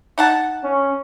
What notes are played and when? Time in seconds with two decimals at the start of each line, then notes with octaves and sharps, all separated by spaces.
0.18 D#4 F#5 A5
0.64 C#4